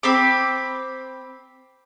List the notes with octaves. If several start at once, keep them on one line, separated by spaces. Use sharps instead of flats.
C4 B5 D6